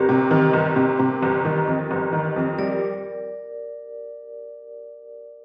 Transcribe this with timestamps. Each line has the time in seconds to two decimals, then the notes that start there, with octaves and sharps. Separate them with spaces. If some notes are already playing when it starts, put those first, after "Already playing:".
Already playing: G1 C4 G4 A#4
0.09 C3
0.31 D#3
0.53 G1
0.76 C3
0.99 C3
1.23 G1
1.45 D#3
1.67 F2
1.91 G1
2.13 D#3
2.36 F2
2.58 G3 A#4 D5